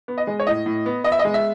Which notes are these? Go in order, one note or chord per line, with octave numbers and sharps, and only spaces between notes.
B3
D#5
G#3
C#5
A2 D#5
A2
B3
B3 D#5
E5
D#5
G#3
E5